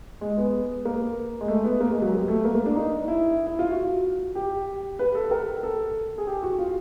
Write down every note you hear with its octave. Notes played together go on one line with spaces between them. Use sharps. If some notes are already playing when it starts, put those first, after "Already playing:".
G#3
B3
A#3
G#3
A3
B3
A#3
G#3
F#3
G3
A3
A#3
A#3
D4
D#4
E4
E4
F4
F#4
G4
B4
A4
A#4
A4
G#4
G4
F#4
F4